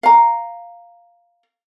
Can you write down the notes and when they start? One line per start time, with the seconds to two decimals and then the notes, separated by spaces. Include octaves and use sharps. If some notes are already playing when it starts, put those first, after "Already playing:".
0.03 F5 A#5